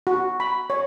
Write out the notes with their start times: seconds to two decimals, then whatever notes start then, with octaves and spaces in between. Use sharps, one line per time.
0.07 F#4
0.40 B5
0.70 C#5